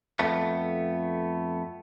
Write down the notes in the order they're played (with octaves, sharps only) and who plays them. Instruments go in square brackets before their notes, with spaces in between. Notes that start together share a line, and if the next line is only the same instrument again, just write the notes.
[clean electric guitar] F2 A3 B3